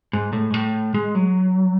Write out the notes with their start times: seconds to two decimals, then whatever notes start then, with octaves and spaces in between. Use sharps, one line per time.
0.13 G#2
0.33 A2
0.50 G#2
0.54 A2
0.94 G#3
1.15 F#3